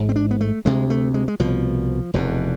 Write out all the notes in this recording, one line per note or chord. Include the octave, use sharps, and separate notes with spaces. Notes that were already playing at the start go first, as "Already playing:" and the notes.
Already playing: A1 G#2
C4
D4
B3
A3
D2 C3 G#3
A3
G#3
G#3
C2 B2 F3
F1 E2 B2